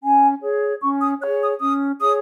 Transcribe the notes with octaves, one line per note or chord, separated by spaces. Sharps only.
C#4 G#5
G#4 C#5
C#4 C#6
D#6
G#4 C#5 F#6
D#6
C#4 D#6
G#4 C#5 D#6